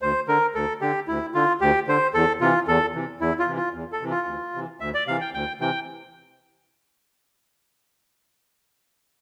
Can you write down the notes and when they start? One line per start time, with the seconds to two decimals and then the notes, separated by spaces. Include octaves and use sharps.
0.02 D2 C5
0.28 D3 A#4
0.55 D2 A4
0.81 D3 G4
1.08 D2 E4
1.34 D3 F4
1.61 D2 G4
1.88 D3 C5
2.14 E2 A4
2.41 C3 E3 F4
2.68 E2 A4
2.95 C3 E3
3.21 E2 E4
3.39 F4
3.48 C3 E3
3.57 F4
3.74 E2
3.92 A4
4.02 C3 E3
4.10 F4
4.27 D2
4.55 C3 E3
4.80 D2 E5
4.94 D5
5.07 C3 E3 F5
5.21 G5
5.34 D2 G5
5.60 C3 E3 G5